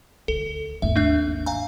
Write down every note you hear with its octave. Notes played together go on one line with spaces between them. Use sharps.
D2 A4
G#1 D#2 E5
A3 D4 E5
F5 G#5 A#5